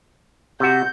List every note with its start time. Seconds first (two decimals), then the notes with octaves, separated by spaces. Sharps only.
0.60 C3 F#4 G6